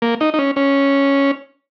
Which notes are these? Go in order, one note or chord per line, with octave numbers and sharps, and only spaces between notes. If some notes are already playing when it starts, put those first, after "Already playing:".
A#3
D#4
D#4
C#4
C#4